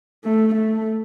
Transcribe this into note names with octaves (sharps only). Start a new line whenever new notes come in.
A3
A3